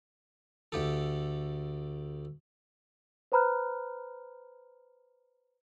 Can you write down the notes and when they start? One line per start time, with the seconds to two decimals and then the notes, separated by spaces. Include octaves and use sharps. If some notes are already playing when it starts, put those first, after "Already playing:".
0.72 D2 G4 A4
3.32 B4 C5 A#5 B5 F6 F#6